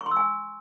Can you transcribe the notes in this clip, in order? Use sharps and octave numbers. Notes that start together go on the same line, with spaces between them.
C#6
C6
E6
G#5